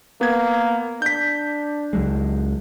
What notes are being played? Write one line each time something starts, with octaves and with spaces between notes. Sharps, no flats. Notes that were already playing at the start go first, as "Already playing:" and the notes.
A#3 B3 G#6
D4 G6 B6
C#2 F#3 G#3